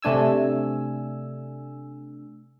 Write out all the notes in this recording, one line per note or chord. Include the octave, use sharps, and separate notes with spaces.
C3 A3 D4 G#5 E6